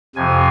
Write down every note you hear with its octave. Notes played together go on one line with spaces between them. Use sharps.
F2 C3 F3 G#5